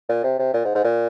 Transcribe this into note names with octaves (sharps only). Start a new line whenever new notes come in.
A#2
C3
C3
A#2
G#2
G#2
A#2